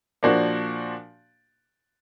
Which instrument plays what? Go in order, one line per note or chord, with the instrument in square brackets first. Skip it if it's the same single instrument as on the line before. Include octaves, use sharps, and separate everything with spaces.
[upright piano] A#2 F3 A#3 D4 F#4